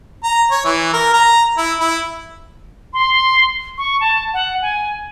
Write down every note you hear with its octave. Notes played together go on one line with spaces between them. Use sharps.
A#5
C#5
E3
A#4
A#5
E4
E4
C6
C#6
A5
F#5
G#5